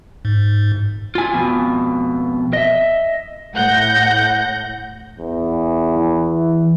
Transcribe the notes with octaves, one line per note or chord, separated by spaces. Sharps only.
G#2
F4 G#5
F2 B2
D#5 E5
A2 F#5 G6 A#6
E2
E3